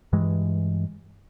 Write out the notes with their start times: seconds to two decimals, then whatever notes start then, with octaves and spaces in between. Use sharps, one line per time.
0.13 G2 E3 G#3